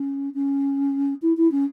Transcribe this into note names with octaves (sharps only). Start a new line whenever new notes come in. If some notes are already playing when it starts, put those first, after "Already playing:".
Already playing: C#4
C#4
E4
E4
C#4